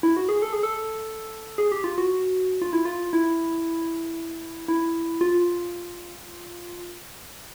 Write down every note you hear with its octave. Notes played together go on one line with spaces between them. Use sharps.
E4
F#4
G#4
A4
G#4
A4
G#4
G4
F4
F#4
F4
E4
F4
E4
E4
F4